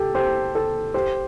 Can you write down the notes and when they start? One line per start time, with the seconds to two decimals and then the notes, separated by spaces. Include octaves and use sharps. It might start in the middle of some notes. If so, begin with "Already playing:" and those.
Already playing: G4 A4
0.15 G4 C5
0.55 A4
0.94 G4 C5